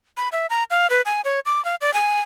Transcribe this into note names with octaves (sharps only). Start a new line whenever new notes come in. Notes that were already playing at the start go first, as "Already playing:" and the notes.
B5
E5
A#5
F5
B4
G#5
C#5
D6
F5
D5
G#5